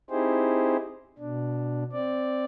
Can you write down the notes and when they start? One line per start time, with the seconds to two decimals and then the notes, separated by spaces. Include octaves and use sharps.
0.10 C4 D#4 E4 G4 G#4 C5
1.19 B2 D4
1.92 C4 D5